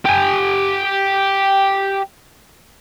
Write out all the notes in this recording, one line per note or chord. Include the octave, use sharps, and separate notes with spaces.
G4 G#5